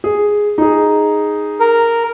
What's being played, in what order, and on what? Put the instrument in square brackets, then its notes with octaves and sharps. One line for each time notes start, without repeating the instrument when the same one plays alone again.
[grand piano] G#4
D#4 G#4
[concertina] A#4